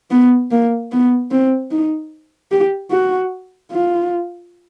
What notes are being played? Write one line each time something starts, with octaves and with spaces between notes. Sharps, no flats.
B3
A#3
B3
C4
D#4
G4
F#4
F4